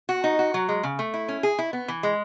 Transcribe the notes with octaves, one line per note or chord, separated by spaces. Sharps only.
F#4
D#4
F#4
F#3
G#3
C#3
A3
E4
C#4
G#4
E4
B3
E3
G#3